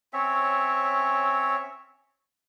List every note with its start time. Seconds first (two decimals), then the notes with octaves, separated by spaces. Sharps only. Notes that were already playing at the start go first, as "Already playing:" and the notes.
0.13 C4 C#4 C#5 E5